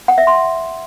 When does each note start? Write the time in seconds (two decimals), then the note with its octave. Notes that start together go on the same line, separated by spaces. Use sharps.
0.08 F#5
0.18 E5
0.27 C6